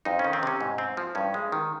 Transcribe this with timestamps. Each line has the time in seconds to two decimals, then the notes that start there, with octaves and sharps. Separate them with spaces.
0.05 F2 D#4
0.19 C#4
0.24 D#3
0.33 C4
0.43 C3 C#4
0.61 G#2
0.78 C4
0.97 F3
1.15 G2 C#4
1.34 G#3
1.52 D#3